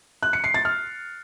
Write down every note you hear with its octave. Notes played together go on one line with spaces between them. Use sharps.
F#6
C#7
C7
A6
F6